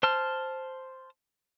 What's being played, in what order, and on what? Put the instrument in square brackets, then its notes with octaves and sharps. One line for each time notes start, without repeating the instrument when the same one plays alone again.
[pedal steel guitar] C5 A5 F6